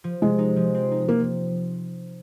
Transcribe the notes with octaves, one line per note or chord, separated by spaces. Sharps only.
F3
C3 G#3
D#4
F3
C4
D#4
F3 A#3